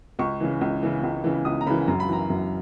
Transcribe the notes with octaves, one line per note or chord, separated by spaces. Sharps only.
C#2 C#6
C#3 E3
C#2
C#3 E3
C#2
C#3 E3
C#2 D#6
A#5
C#3 E3 B5
F#2 A#5
B5
E3 A#5
F#2